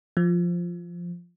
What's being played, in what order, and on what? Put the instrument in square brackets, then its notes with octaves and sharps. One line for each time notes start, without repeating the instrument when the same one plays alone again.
[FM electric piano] F3